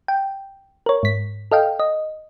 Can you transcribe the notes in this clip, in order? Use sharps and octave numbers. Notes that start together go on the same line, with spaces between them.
G5
A#4 C#5
G#2 B6
A4 D#5 F5 G5
D#5